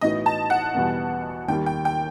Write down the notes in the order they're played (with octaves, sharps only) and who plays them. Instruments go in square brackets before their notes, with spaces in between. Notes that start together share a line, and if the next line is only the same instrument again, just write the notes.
[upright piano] A2 E3 B3 D#4 F#4 [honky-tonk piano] D#5
[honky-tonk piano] A5
F#5
[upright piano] E2 B2 G3 B3
[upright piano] D#2 D#3 G3 [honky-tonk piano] G5
[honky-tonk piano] G5
G5